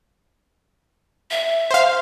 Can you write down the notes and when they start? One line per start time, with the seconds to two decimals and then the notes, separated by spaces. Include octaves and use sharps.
1.31 E5
1.71 C5 F5